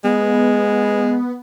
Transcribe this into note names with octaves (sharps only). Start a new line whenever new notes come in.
G#3 B3